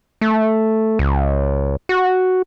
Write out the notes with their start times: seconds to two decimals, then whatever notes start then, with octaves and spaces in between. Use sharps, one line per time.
0.21 A3
0.99 C#2
1.89 F#4